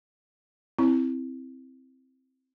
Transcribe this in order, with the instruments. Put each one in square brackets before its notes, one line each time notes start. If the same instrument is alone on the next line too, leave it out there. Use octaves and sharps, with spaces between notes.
[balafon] C4 E4